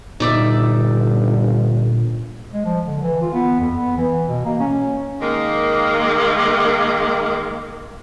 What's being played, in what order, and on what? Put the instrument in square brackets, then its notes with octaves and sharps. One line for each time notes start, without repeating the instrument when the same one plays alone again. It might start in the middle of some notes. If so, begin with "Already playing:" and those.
[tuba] G1 [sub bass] A#2 [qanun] D#4 D5 E5
[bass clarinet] G#3
F3
D3
E3
F4
B3
F2
B3
E3
B2
A#3
C#4
[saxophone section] D#3 G#3 A#3